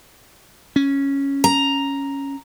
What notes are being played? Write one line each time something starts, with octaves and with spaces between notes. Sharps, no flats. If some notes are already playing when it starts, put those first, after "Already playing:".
C#4
A#5